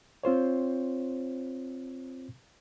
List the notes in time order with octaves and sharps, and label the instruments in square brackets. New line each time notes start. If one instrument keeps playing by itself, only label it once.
[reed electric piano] C4 F4 C5 C#5